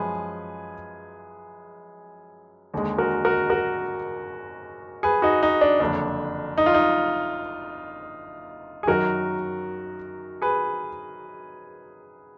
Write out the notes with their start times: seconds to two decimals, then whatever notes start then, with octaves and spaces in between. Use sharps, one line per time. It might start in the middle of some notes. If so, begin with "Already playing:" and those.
Already playing: F#2 F3 G#3 G#4 B4
2.74 D#2 D3 G#3
2.98 F#4 A#4
3.25 F#4 A#4
3.50 F#4 A#4
5.03 G#4 B4
5.22 D#4 F#4
5.43 D#4
5.61 D4
5.80 F#1 F2 D3 D4
6.58 D#4
6.66 F4
6.74 D#4
8.83 G#4
8.87 F#2 D#3 F#3 F#4 A#4
10.42 G#4 B4